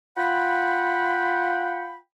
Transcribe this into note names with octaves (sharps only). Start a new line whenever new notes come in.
F4 F#5 G5 B5